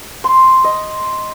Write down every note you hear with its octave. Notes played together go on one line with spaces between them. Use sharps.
C6
D#5